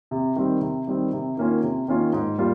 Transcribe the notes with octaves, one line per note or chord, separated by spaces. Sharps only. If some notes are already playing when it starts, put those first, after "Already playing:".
C3
D#3 G3 C4
C3
D#3 G3 C4
C3
D#3 A#3 C#4 F4
C3
D#3 A#3 C#4 F4
G#2
G3 A#3 F4